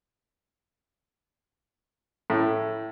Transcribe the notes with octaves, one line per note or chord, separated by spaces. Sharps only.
A2